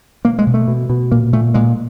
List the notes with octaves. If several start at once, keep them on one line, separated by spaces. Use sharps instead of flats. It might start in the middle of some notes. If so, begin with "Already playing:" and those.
B2 A#3
G#3
B2
A3
B2
B2
A#2 A#3
A#2 A3
A#2 G#3